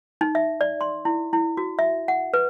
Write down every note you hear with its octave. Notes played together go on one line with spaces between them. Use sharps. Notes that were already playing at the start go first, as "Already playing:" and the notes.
D#4
E5
D5
C6
E4
E4
F#4
E5
F#5
B4